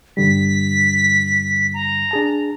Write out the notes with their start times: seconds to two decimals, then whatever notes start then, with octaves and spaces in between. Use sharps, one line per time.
0.17 G2 D3 G3 B6
1.74 A#5
2.11 D4 G#4 A5